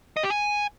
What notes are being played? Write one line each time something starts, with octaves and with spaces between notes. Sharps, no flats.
D#5
G4
G#5